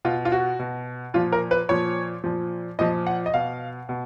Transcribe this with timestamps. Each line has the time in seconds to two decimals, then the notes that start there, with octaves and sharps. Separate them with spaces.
0.05 B2 F4
0.25 F4
0.32 F#4
0.59 B2
1.14 A#2 F3 F4
1.32 A#4
1.51 B4
1.69 A#2 F3 C#5
2.24 A#2 F3
2.79 A#2 F3 D#5
3.07 F#5
3.26 D#5
3.34 B2 F5
3.89 B2